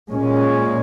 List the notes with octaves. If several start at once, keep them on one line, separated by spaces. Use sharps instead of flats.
A#2 G#3 C#4